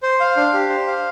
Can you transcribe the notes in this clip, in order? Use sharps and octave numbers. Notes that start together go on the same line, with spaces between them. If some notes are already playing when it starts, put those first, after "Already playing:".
C5
F5
D4
G4
C5
F5